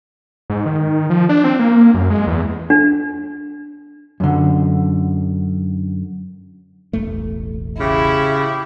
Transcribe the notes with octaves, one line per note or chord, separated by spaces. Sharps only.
G#2
D#3
F3
D4
C4
A#3
F#2
G#3
E2
D4
F#2 D3
E1 A1 A3
C#3 E4 G4